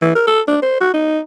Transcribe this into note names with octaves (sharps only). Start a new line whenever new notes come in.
E3
A#4
A4
D4
C5
F#4
D#4